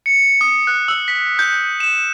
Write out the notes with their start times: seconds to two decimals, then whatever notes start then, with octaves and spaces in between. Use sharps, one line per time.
0.06 C#7
0.41 D#6
0.67 F#6
0.88 E6
1.08 B6
1.39 G6
1.80 E7